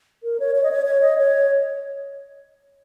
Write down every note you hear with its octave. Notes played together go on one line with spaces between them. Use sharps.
A#4
C#5
C#5
D#5
C#5
C#5
D#5
C#5